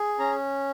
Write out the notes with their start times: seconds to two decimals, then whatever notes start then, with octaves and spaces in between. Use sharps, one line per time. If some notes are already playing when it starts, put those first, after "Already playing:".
Already playing: G#4
0.19 C#4 A#5